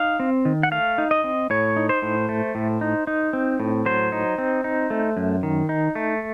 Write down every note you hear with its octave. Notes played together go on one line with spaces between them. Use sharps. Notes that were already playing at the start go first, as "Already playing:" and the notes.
Already playing: D#4 F5
C4
D#3
F#5
A3 F5
D#4
D#5
C4
A2 C#5
D#4
C5
A2
A3
A2
D#4
D#4
C4
A2
F#3 C5
D#4
C4
D#4
A3
F#2
D#3
D#4
A3